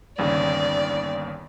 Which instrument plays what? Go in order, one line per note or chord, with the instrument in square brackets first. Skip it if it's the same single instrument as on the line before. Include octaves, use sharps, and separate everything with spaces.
[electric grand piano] G1 D#2 C#3 [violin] D5